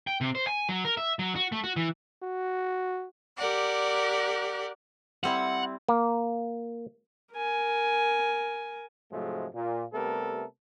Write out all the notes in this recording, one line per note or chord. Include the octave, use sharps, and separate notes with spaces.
G5
C3
C5
G#5
F#3
A#4
E5
F#3
F#4
A3
F#4
E3
F#4
G4 A#4 D5 F#5
G3 C4 E4 F#5
A#3
A#4 G#5
G#2 C3 F3 F#3 G#3 A3
A#2
C3 G3 A3 B3 A4 A#4